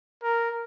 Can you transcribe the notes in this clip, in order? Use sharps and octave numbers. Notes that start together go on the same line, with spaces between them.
A#4